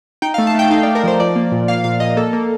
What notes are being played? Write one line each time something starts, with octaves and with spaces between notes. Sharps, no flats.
D#4 G5
F5
A3
A5
A3 G5
D#4 F5
D5
A3
A#4
F3 C5
F3 D5
A#3
A#2
A#3 F5
A#2 F5
A#2 D#5
A#3 A4
A#3